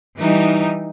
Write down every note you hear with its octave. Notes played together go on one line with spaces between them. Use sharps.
E3 G3 D#4